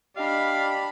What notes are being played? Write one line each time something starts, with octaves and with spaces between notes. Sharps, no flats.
D4 G4 D#5 F5 B5